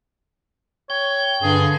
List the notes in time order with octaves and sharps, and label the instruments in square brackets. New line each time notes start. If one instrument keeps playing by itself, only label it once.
[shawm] C#5 [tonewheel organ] G5
[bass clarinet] G2 [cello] D3 [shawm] G#4